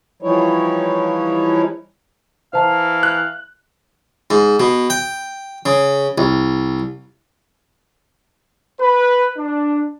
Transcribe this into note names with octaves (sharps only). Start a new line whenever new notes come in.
E3 F3 G3 D#4 E4 C#5
E3 C5 F5 A5 A#5
F#6
G#2
B2
G5
C#3
C2
B4
D4